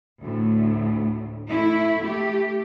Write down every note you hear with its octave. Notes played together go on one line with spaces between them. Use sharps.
D2 A2
A3 E4
A3 G4